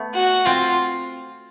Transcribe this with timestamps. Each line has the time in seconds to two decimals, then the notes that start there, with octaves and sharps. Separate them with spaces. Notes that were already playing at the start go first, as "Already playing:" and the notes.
Already playing: A3 B3
0.14 F#4
0.46 C4 F4